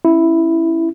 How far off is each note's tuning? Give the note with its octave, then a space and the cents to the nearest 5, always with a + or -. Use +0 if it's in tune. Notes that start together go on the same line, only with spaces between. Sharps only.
C#4 -20 E4 +0